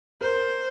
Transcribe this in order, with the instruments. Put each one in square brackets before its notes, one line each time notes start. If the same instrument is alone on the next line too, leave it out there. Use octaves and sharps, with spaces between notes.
[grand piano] A#4 [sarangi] C5